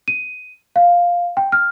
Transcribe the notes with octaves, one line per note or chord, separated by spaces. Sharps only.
D#7
F5
G5
F6